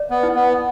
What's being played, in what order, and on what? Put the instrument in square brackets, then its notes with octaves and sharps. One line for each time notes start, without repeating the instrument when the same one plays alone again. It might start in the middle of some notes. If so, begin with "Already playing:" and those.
Already playing: [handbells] D5
[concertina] B3
[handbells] E4
[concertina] B3